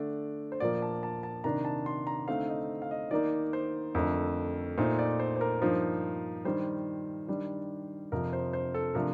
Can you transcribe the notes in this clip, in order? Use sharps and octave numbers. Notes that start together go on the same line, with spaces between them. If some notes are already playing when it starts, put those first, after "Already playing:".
Already playing: D3 A3 D4 D5
C5
A#2 F3 A#3 D5
A5
A5
A5
C3 D#3 A#3 D4 A#5
A5
C6
A#5
D3 A3 C4 D#4 F5
D#5
F5
D#5
D#3 A#3 D#4 D5
C5
F2 D3 A3 A#4
A#2 A3 D#4 C5
D5
C5
C5
A#4
G2 F3 A#3 D#4 C5
G2 D#3 G3 C5
D#3 G3 D4
F2 C3 F3 A#4
C5
C5
A4
C3 F3 A3 D4 A#4